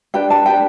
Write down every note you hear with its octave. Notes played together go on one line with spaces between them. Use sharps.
D4 G4 B4 G5
A5
D4 G4 B4 G5